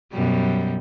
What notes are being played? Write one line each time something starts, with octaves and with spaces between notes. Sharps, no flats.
F#2 B2 G3